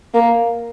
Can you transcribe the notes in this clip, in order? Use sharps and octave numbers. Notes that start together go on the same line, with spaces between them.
A#3